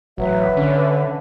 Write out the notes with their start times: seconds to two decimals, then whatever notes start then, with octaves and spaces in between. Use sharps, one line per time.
0.18 A1 F#3 B4 E5
0.57 D3 C#4